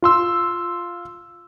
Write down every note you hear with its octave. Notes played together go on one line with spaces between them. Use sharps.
F4 C6 E6